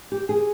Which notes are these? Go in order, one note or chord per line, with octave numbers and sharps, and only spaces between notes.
G4
G#4